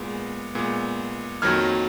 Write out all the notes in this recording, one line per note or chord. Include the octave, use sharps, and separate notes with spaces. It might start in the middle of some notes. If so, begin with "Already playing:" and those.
Already playing: A#2 G#3 B3
A#2 G#3 B3
F2 D#3 F#3 A#3 F6 G#6